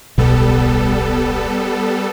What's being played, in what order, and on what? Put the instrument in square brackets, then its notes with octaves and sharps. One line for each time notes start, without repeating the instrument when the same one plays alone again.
[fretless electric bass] D1 B1 B2 [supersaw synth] G3 B3 A4